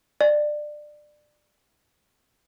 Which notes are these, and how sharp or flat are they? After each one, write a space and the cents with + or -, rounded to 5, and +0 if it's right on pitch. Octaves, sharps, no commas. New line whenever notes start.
D5 +20